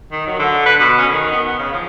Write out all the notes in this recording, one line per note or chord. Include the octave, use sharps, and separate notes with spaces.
D#3
F#3
D3
B4
B2
C#4
D#3
B3
B3
C#3
F3